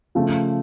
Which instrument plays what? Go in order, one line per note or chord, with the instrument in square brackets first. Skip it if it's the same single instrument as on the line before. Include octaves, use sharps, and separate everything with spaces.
[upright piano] C#3 F3 A3